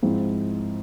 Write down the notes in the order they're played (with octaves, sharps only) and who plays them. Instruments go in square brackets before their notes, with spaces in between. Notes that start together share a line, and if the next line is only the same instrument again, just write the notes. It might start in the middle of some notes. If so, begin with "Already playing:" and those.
[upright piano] G#2 F3 C4 E4